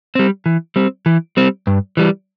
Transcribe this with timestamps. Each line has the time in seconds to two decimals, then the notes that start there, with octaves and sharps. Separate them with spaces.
0.15 G3 C4
0.46 E3
0.76 G3 C4
1.06 E3
1.37 G3 C4
1.67 G2
1.97 E3 G3